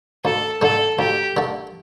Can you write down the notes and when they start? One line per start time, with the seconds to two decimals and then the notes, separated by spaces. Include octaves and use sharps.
0.24 D2 A4
0.62 D3 A3 A4
0.99 D2 G4
1.37 D3 A3